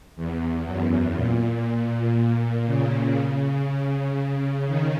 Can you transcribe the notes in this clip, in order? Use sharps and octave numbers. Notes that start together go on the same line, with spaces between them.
E2
F#2
A#2
C#3
D#3